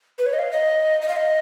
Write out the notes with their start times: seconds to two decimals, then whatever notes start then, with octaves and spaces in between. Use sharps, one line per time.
0.18 B4
0.26 C#5
0.33 D#5
0.39 F5
0.51 D#5
1.02 D#5
1.09 F5
1.17 D#5